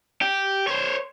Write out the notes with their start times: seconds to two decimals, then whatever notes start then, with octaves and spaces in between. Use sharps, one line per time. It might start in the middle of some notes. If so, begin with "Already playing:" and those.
0.22 G4
0.67 C5 C#5